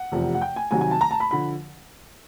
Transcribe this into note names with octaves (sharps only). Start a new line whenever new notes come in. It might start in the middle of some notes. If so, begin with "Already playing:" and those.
Already playing: F#5
F1 E2 C3 F3
F#5
G5
G#5
C2 C3 D#3 F#3 G#5
G#5
A5
A#5
A5
B5
D3 F3 B5